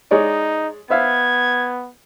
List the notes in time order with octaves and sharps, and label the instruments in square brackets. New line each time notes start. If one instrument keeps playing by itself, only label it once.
[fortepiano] G#3 C#5 D5 [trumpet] D#4
[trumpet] B3 [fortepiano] C5 E5 F5 [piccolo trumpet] G#6